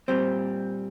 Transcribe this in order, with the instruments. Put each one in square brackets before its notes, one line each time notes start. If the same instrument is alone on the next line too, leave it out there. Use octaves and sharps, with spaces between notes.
[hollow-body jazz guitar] A#2 G3 C4 C5